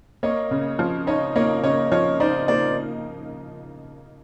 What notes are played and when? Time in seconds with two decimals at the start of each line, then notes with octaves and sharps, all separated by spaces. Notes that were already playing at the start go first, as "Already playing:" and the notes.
0.23 A#3 C#5 D#5
0.51 C#3
0.79 F3
1.07 D#4 C#5 D#5
1.36 A#3 C#5 D#5
1.63 C#3 C#5 D#5
1.91 F3 C#5 D#5
2.20 D#4 C5 D5
2.48 A#3 C5 D5